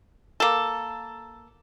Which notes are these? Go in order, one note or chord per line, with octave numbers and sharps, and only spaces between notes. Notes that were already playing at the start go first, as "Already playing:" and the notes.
A#3 A4